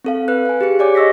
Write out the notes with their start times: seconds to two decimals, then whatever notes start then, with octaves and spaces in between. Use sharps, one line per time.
0.05 C4 A4 F5
0.28 B4 F#6
0.45 F5 G#5
0.61 G4 G#4 C#7
0.79 G4 C#5 D5 G#5 D6
0.95 D#5 C#6 E6 A#6 B6